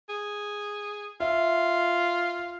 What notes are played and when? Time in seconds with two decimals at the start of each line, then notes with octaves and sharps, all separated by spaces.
0.09 G#4
1.20 F4 E5